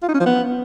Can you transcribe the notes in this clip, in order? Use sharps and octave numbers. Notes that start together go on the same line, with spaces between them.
F4
D#4
C#4
F3
B3